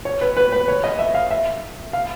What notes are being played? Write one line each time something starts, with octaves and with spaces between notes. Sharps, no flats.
C#5
B4
B4
B4
C#5
D#5
E5
F5
E5
F5